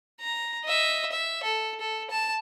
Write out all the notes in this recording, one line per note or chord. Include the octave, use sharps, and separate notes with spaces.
A#5
D#5 E5
E5
A4
A4
A5